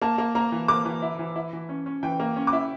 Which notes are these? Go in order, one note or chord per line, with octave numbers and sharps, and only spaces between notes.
A#3 A5
A#3
A#3 A#5
E3
A#3 D6
E3
E4
E3
E4
E3
C#4
C#4
E3 G5
A#3
C#4
D6
E4